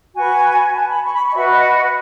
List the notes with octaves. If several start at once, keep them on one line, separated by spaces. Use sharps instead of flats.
F#4 B4 G#5
A5
B5
C#6
B5
C#6
D#5
F#4 B4 E5
D#5